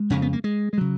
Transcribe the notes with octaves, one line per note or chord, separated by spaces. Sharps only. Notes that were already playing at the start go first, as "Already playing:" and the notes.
Already playing: G#3
F2 C#3 C#4
B3
A#3
G#3
G#3
C#3 F#3